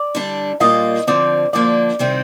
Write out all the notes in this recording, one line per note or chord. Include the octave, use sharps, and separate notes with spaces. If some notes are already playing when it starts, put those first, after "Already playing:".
Already playing: D5
D3 G3 D4
A#2 G3 A#3 F4 D#5
D3 F3 C4 D5
D3 F3 A#3 D4 D5
C3 D#3 G3 C4